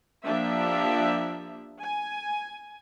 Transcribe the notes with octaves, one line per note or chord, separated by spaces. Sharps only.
F3 A#3 D4 G4 E5
G#5